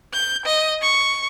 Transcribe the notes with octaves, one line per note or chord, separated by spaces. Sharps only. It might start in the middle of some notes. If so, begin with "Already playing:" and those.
G6
D#5
C#6